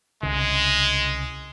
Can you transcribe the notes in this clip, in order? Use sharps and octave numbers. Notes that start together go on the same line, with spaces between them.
C2 C#3 G#3